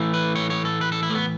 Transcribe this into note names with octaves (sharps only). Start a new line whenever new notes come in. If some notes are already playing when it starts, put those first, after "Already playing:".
Already playing: A2 E3 A3
B4
C#5
C#5
A4
B4
A4
E4
A3
B3